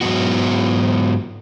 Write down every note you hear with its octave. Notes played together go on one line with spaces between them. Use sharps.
G#2 F#3 B3 F#4